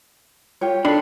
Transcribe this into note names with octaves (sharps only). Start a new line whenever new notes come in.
F4 G4 C#5
D4 A4 B5